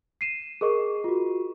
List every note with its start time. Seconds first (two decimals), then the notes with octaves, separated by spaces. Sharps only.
0.21 C7 D#7 E7
0.61 G#4 A#4 D#5 C#6
1.04 F4 F#4